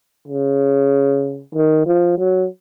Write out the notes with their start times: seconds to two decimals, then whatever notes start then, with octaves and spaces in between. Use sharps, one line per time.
0.28 C#3
1.55 D#3
1.86 F3
2.18 F#3